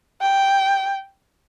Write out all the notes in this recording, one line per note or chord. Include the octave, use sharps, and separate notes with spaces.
G5